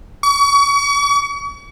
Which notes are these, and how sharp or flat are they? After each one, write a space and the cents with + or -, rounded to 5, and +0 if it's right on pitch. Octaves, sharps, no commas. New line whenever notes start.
C#6 +40